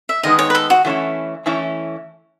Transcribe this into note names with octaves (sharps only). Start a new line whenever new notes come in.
E5
D#3 G#3 B3 D#4 D#5
C#5
B4
A4
F#4
E3 A3 C#4 E4
E3 A3 C#4 E4